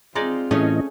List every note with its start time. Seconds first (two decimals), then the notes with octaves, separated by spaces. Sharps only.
0.15 G#3 C4 D#4 F4 D5
0.51 A2 E3 A3 C#4 G#4 D#5